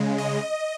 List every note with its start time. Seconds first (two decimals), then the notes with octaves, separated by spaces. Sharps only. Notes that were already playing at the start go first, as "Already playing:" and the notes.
Already playing: C#3 G#3
0.18 D#5